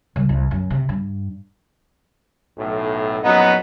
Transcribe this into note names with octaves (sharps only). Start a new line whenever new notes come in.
C2
C2
F#2
C3
G2
B1 A2
A#1 F#2 F#3 B3 D#4 B4